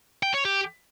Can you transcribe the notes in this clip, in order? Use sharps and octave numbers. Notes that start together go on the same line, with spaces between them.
G5
C#5
G4